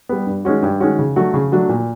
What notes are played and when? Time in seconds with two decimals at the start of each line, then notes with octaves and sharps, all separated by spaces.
0.09 G3 B3
0.26 G2
0.45 D#3 G#3 C#4 F#4
0.63 G2
0.80 D#3 G#3 C#4 F#4
0.99 C#3
1.16 F#3 A3 D4 F#4
1.34 C#3
1.52 F#3 A3 D4 F#4
1.69 A#2